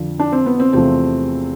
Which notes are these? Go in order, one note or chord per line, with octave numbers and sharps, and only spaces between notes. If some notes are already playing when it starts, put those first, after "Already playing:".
Already playing: F2 D3 F3
D4
C4
B3
C4
E2 C3 F3 A3 C4